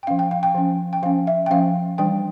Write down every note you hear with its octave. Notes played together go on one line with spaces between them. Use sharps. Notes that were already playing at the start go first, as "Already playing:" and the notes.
G5
F3 C#4 F5
G5
F5
G5
F3 C#4
G5
F3 C#4 F5
E5
G5
F3 C#4 F5
E3 G3 D4 G5